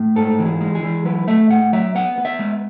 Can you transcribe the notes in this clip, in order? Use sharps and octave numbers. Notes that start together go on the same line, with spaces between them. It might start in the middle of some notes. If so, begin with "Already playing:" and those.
Already playing: A2
G#2 A4
E3
G#4
G#3
G#4
E3
F#3 B4
A3 E5
A2 F#5
F#3 E5
B3 F#5
B3
E5
G#3